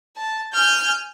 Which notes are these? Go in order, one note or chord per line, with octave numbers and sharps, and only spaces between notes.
A5
G#5 F6 G6